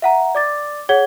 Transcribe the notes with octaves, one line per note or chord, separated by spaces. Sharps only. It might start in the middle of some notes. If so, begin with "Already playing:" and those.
E5 F#5 A#5
D5 D6 A6
G#4 C#5 F#5 G#6 G7